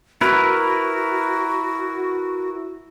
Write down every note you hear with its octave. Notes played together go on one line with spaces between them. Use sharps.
E4 F#4 A#4 B4